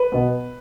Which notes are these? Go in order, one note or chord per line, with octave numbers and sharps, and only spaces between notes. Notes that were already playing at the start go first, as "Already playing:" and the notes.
Already playing: B4
B2 B3